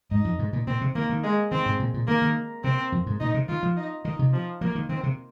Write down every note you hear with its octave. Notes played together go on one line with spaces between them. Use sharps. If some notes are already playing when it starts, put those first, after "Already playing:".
G#2 D#4
F2
G#2
A#2
A#2 C4
C3
D#3 A#3
D#3
G#3
D#3 C4
G#2
A#2
A#2
D#3 A#3
D#3
C3 C4
F2
G#2
A#2 D#4
C3
D#3 F4
F3
D#4
D#3 D#4
C3
F3
F3 A#3
D#3
D#3 C4
C3